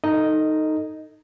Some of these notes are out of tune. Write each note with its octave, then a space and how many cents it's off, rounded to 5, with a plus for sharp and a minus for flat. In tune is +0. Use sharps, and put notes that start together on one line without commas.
D#4 +0 A4 +20 D#5 +0